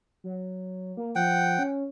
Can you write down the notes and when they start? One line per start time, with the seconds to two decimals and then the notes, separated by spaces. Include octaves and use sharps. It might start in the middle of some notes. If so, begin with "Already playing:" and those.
0.24 F#3
0.97 A#3
1.15 F3 F#5 G5
1.59 C#4